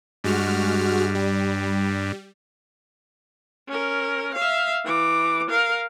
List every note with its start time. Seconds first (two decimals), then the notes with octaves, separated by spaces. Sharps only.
0.24 G2 G#3 F#4 F6
1.15 G3
3.69 C#4 A#4
4.34 E5 F5
4.85 E3 D6
5.50 A#4 F5